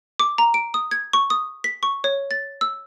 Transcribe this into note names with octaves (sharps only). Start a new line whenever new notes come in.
D6
A#5
D7
D#6
G#6
C#6
D#6
B6
C#6
C#5
A6
E6